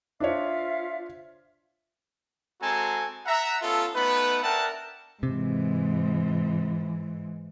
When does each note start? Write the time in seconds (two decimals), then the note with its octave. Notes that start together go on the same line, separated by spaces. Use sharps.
0.20 D4 F4 C5 C#5 E5 F5
2.61 G#3 C4 F#4 A4 G#5 A#5
3.25 E5 F#5 A#5
3.62 B3 C#4 F4 A4
3.94 A3 B3 D#4 B4
4.43 D4 A#4 E5 F#5 G5 A5
5.23 G#2 C3 E3